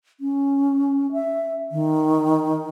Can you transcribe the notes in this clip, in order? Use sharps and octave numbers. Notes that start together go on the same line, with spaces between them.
C#4
E5
D#3